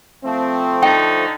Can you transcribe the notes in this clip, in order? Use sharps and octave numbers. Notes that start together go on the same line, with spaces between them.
F3 A3 C4
D3 D#4 G5